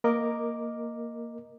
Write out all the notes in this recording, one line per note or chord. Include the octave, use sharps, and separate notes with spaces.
A#3 A#4 D#5 D6